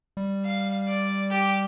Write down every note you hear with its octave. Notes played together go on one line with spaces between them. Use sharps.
G3
F5
D5
G4